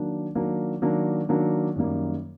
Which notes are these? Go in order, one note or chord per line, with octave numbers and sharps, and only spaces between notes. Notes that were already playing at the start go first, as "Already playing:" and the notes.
Already playing: D#3 F#3 A#3 D4
D#3 F#3 A#3 D4
D#3 F#3 A#3 D4
D#3 F#3 A#3 D4
F#2 D#3 G3 A#3